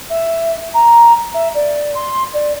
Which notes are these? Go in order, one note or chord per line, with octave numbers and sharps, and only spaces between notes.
E5
A#5
E5
D5
C6
D5